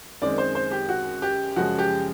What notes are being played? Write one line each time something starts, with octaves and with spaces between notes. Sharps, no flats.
F#2 D#3 G#3 C4 D5
C5
C5
G4
F#4
G4
F#2 C#3 F3 G#3 F#4
G4